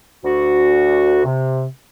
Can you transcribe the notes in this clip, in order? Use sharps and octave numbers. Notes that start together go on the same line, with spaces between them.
D2 F#4
C3